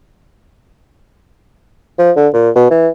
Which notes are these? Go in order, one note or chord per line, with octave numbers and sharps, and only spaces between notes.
F3
D3
A#2
B2
E3